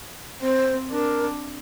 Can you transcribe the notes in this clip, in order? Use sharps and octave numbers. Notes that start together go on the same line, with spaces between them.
C4 C5
D4 A#4